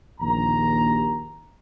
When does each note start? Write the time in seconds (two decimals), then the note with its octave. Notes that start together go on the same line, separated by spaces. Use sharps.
0.21 A#1 D#2 A#5